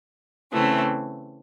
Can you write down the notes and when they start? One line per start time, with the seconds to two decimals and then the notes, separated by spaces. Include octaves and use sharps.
0.53 C#3 E3 A3 C4